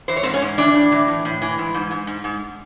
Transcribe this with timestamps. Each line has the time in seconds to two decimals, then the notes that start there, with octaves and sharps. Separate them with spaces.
0.08 E3 C5
0.16 C#5
0.23 G#2 C4 C5
0.33 C#4 C#5
0.42 G#2
0.58 E3 D4 D5
0.74 A2
0.92 E3
1.08 A2
1.25 A2
1.42 E3
1.58 G#2
1.74 G#2
1.91 G#2
2.07 G#2
2.24 G#2